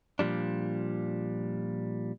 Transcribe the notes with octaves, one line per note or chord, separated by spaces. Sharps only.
A#2 F3 G3 D4